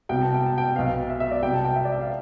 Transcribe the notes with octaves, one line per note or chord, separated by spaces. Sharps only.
C2 B2 G5
A5
G5
A5
G5
B1 B2 F5
E5
E5
D5
C2 B2 G5
A5
G5
E5
D5
E5
F5